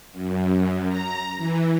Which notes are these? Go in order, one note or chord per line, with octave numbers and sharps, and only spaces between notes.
F#2
A#5
E3